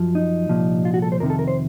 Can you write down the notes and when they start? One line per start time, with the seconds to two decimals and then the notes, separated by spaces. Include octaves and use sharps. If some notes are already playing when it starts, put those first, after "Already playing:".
Already playing: F#2 F3
0.15 D#4
0.49 C2 A#2 F3
0.85 F4
0.94 F#4
1.02 A4
1.12 C5
1.20 F2 C3 D#3 A#4
1.30 A4
1.39 A#4
1.48 C5